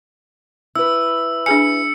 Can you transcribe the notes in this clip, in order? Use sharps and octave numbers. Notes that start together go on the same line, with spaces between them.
E4 B4 E6
D4 G#4 G#5 C#7